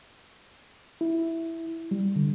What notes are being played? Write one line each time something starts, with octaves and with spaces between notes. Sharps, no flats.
E4
G3
D3